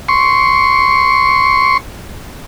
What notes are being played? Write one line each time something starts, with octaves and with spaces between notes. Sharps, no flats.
C6 C#6